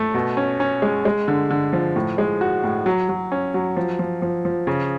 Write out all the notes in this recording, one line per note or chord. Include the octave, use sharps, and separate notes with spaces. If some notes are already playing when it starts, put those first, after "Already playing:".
Already playing: A3
B2
C#4
C#4
G#3
G#3
D3
D3
F3
A2
G#3
F#4
A2
F#3
F#3
C#4
F#3
F3
F3
F3
F3
C#3